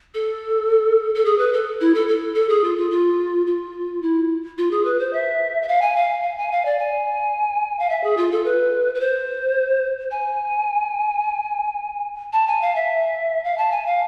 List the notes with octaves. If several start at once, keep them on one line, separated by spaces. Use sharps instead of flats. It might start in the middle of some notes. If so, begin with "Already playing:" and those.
A4
A4
G#4
B4
A4
E4
A4
A4
A4
G#4
F4
F4
F4
F4
E4
F4
G#4
B4
C5
E5
E5
F5
G#5
F5
F5
G#5
F5
D5
G#5
F5
E5
G#4
F4
A4
B4
B4
C5
G#5
A5
G#5
F5
E5
F5
A5
G#5
F5